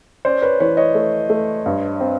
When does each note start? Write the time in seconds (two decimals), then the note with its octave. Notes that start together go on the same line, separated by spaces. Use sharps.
0.25 C#4 C5 D5
0.42 B4 C#5
0.60 E3 B4 C#5
0.77 C#5 D#5
0.95 A3
1.30 A3
1.66 G2
2.00 C4